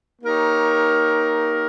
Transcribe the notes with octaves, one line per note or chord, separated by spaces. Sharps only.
A#3 D#4 G4 A#4 C#5